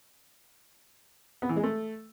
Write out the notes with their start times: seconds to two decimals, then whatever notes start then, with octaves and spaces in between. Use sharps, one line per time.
1.42 B3
1.49 E3
1.56 G#3
1.64 A3